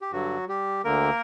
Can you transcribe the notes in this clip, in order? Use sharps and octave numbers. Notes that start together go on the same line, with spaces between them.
G4
G2 D3 F#3 F#4
G3 G4
D2 D3 A#3 A#4